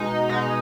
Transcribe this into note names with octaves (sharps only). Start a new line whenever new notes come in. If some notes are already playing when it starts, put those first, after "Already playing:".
Already playing: B2 G#3 D#4
B2 G#3 D#4